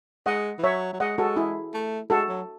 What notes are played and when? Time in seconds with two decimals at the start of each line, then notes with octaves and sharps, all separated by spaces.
0.26 G#3 D#5 F#5
0.58 E3
0.63 F#3 C#5 E5
0.93 F#3
1.00 G#3 D#5 F#5
1.18 G#3 F#4 A4
1.36 E4 G#4
1.74 A3
2.10 G#3 F#4 A4
2.29 F#3